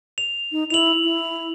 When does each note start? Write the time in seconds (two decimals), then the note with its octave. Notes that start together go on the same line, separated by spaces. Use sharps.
0.18 F7
0.52 D#4
0.70 E4 F7 F#7
1.04 E4